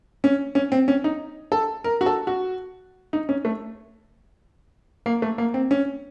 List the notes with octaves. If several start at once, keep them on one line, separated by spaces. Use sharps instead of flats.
C#4
C#4
C4
C#4
D#4
A4
A#4
F#4
A4
F#4
D#4
C#4
A3
A#3
A3
A#3
C4
C#4